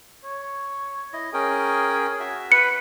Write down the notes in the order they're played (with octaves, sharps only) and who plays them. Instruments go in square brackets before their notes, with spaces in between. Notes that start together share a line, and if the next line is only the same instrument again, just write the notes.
[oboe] C#5
[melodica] E4 D#5
[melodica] C#4 A#4 G5 [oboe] G#4
[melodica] F#4 E5
[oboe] B4 [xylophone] C#7